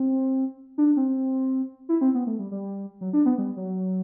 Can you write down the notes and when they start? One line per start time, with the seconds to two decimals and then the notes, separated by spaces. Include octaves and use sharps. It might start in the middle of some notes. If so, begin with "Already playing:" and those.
Already playing: C4
0.78 D4
0.97 C4
1.89 E4
2.01 C4
2.14 B3
2.27 A3
2.39 G3
2.51 G3
3.01 F#3
3.13 D4
3.26 B3
3.38 G3
3.57 F#3